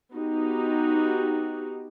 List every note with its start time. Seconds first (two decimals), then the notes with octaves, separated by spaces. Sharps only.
0.14 B3 D#4 F#4 G4